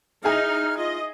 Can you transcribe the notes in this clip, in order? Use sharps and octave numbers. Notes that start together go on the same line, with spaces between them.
D#4 E4 G#4 G#5 F6
F4 D#5